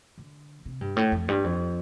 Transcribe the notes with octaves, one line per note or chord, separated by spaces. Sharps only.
D3
C3
G2
A2
F2
G2
F2